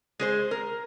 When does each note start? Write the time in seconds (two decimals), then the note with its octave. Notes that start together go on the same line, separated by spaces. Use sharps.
0.20 G#3 G#4 C5
0.51 A#4